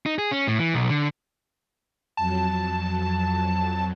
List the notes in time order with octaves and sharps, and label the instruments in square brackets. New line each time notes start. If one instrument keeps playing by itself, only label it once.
[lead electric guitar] D#4
G#4
C#4
A2
E3
B1
D3
[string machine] F2 F#3 [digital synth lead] A5